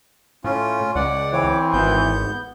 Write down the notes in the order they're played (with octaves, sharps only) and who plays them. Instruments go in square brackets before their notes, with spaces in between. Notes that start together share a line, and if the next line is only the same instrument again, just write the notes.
[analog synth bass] A2 [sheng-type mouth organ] C#4 F4
[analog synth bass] C#2 [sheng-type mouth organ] D5 F#5
[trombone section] E3 C4 [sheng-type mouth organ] C#5 D6
[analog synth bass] G#1 [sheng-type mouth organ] B3 G6